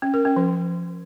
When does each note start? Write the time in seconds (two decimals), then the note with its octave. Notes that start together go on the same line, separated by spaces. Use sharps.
0.02 C#4
0.14 A#4
0.25 C#4
0.36 F3